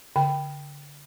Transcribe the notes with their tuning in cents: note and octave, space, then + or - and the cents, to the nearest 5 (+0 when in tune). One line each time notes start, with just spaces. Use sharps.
D3 -35 G5 +0